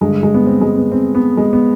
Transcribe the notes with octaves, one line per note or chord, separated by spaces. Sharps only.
G2 D3 G#3
G#3
B3
C4
G#3
B3
C4
B3
G#3
B3